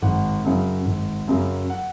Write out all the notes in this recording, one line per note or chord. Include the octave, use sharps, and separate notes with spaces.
G#1 F#5
F#2 C#3 F#3
G#1
F#2 C#3 F#3
F#5